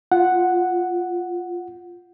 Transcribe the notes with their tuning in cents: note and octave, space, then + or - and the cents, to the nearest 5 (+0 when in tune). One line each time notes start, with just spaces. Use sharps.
F4 +0 F#5 +0